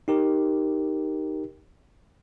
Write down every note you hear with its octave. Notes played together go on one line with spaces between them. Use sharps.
D#4 G4 A#4